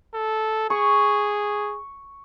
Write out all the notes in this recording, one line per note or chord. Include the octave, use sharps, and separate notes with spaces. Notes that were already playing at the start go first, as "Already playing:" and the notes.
A4
G#4 C#6